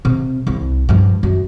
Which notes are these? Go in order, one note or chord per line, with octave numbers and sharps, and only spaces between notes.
C3
C2
G2 F3
F#2